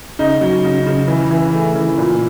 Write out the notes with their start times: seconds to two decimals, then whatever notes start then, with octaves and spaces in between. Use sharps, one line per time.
0.19 C#3 D#4
0.41 F#3
0.64 C#3
0.87 C#3
1.08 E3
1.30 E3
1.53 A3
1.76 E3
1.98 A#2